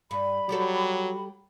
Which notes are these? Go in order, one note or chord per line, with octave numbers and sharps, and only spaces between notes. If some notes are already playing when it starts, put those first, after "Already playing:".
G2 B5
F#3 G3 G4 A4